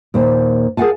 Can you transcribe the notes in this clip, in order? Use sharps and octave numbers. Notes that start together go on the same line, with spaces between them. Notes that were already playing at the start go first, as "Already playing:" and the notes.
D#2 A#2 C5
G#4 A#4 F5 F#5 G#5 A5